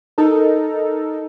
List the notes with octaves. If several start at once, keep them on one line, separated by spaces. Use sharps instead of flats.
D#4 A4 A#4